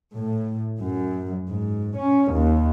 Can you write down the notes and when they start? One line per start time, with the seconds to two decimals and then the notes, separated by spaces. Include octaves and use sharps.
0.15 A2
0.80 F#2
1.50 G#2
1.97 C#4
2.33 D#2